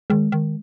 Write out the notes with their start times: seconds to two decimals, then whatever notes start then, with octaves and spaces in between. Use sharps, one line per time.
0.10 D#3 G#3
0.32 D#3